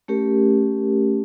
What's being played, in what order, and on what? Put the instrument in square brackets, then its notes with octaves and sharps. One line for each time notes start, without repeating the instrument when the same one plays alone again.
[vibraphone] A3 C#4 G4 A#4